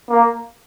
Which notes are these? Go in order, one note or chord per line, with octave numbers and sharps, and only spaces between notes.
A#3